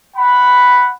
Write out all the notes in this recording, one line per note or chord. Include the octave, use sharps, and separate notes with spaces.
F#5 B5